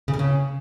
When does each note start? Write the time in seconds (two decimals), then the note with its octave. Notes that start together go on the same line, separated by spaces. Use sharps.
0.08 C#3
0.14 B2
0.19 C#3